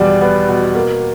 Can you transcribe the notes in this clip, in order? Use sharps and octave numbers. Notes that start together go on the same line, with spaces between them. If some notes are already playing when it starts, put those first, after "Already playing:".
Already playing: E2 B2 G3
B3
B2
A#3